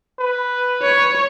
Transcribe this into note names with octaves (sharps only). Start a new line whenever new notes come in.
B4
C#5